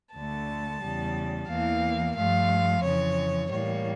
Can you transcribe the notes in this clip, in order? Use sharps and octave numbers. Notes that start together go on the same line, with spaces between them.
D2 D3 A3 A5
E2 C#3 G3
E2 E3 A#3 F5
G2 F3 A3 F5
F2 C#3 E3 C#5
A2 E3 G3 A#3 C#5